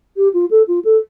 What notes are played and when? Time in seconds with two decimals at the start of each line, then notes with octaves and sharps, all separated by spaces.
0.16 G4
0.33 F4
0.50 A4
0.67 F4
0.84 A4